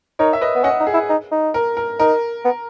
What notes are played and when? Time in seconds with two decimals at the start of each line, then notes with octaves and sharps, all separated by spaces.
0.19 D#4 A#4 C#5
0.33 E5
0.41 B4 D#5
0.55 B3
0.64 C#4 D#5 F#5
0.80 D#4
0.87 G#4
0.94 E4
1.09 D#4
1.31 D#4
1.54 A#4
1.77 A#4
1.99 D#4 A#4
2.45 B3